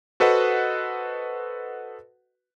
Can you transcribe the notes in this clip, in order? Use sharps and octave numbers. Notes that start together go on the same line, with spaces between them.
F#4 A4 B4 C5 D#5 F#5